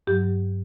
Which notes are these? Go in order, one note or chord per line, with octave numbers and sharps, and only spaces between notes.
G2 F#3 G4